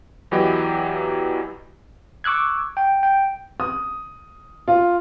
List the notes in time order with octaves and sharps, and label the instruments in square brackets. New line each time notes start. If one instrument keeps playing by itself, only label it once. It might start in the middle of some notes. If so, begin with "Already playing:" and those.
[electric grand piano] E2 E3 F#3 G4 D#5 B5
[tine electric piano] C#6 D6 E6 F#6 G#6
G5
G5
[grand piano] D#6
F4